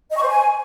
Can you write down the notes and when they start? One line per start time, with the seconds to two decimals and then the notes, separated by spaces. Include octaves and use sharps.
0.11 D#5
0.16 C#6
0.22 C5
0.27 G#5